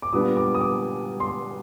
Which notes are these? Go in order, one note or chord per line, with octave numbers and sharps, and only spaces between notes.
D6
A#2 G3 B3 D4 D#6
D6
D#6
D6
C6